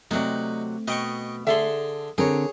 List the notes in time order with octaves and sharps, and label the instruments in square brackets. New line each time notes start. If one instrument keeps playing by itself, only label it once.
[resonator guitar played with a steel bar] C3 F#3 D5 [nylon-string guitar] A3 C4 [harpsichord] D#4
[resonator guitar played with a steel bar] B2 [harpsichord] D#5 G5 C#6
[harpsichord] D3 C6 [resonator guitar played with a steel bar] G#4 A4 E5
[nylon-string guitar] D3 C4 A#4 [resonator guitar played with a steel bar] G4 [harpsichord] G#4 C#5